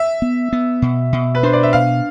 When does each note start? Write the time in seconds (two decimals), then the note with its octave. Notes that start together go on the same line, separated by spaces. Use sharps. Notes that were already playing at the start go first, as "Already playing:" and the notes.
Already playing: E5
0.22 B3
0.53 B3
0.82 B2
1.13 B2
1.35 B4
1.43 D4 C5
1.53 D5
1.63 E5
1.73 B2 F5